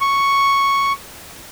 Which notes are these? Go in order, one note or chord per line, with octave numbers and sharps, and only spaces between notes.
C#6